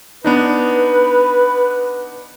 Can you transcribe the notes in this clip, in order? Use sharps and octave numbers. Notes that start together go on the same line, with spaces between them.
B3 D4 D#4 B4